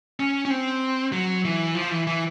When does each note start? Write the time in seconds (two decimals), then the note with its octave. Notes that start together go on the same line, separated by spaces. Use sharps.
0.20 C#4
0.45 C#4
0.50 C4
1.12 F#3
1.45 E3
1.75 F3
1.91 E3
2.07 E3